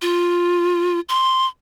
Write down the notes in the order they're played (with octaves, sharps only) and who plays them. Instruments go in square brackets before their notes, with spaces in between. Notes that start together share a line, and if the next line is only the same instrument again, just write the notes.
[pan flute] F4
C6